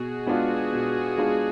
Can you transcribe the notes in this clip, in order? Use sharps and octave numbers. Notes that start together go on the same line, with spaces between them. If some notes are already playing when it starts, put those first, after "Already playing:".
Already playing: B2 F#4 G#4
G#3 B3 D4 F4
B2
G#3 B3 D4 F4